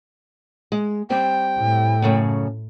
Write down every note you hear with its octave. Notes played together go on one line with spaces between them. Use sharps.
G#3
G3 C4 G5
A2
F#2 C#3 A3